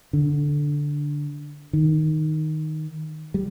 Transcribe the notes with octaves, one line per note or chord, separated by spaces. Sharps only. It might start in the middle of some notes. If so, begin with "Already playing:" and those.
D3
D#3
G3